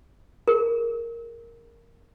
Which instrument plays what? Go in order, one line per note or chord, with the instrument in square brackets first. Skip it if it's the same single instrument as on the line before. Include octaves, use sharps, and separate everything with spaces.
[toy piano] G#4 A#4